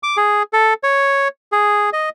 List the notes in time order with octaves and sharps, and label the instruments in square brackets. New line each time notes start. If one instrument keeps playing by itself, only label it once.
[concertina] D6
G#4
A4
C#5
G#4
D#5